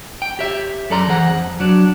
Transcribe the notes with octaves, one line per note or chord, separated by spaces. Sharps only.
G5
G4 C#5 E5
F#2 A4 D5 A#5 C6
E3 G#4 C5 F#5 A#5
F2
F#3 D4